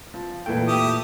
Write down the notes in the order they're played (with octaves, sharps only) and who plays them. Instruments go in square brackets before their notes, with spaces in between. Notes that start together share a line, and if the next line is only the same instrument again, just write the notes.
[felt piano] F3
[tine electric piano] A#2 G5 [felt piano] E3 A3
[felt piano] A3 [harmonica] E4 G4 D#6